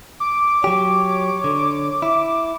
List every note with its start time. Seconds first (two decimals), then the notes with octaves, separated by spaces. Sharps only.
0.20 D6
0.64 F#3 G4 C#5
1.44 D3
2.02 E4